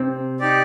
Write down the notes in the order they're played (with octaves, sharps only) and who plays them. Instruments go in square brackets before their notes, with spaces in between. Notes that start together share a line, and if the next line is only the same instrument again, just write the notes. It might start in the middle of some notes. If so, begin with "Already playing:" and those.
Already playing: [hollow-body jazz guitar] C3 C4
[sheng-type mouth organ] D#4 G4 D5